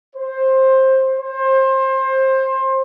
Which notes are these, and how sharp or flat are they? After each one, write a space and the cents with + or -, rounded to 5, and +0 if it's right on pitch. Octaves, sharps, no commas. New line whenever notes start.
C5 +15
C5 +25